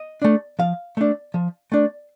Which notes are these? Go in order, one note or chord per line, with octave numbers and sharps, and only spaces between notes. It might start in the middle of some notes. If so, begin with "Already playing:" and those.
Already playing: D#5
A3 D4
F3 F5
A3 D4
F3
A3 D4